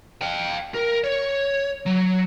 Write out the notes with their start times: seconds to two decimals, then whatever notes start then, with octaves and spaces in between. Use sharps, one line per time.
0.22 F5 G5
0.74 A#4
1.04 C#5
1.86 F#3